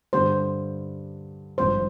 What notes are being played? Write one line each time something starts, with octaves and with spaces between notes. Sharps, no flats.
G2 D3 G3 C5
G#1 G2 F3 C5